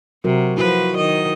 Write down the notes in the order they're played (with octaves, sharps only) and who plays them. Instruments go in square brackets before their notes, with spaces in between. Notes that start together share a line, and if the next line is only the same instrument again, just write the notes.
[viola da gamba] C3 [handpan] F#3 F#4 A#4
[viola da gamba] F3 B4 [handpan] E4 F#4 C5
[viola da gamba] D#3 D#5